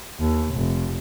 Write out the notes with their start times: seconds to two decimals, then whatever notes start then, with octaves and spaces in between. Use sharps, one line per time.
0.20 D#2
0.53 F1